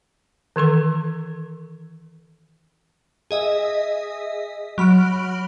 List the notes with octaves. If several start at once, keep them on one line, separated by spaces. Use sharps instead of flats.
D#3 E3 A4 C#6
G#4 D#5 E5
F#3 B5 F6 D7